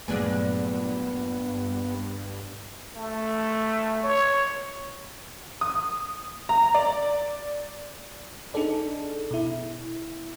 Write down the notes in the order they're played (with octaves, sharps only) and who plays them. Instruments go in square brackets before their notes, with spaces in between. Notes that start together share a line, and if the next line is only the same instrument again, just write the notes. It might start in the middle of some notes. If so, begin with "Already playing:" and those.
[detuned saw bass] G2 [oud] A#2 D4 G#4 [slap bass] F#3 G3 A3 [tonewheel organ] B3
[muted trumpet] A3
C#5
[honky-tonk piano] D#6
A#5
D5
[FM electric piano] D4 D#4 G#4 A4 D5
B2 E4